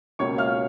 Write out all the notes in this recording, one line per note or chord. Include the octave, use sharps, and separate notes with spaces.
C#2 B2 A#3 C#5 C#6
F5 F6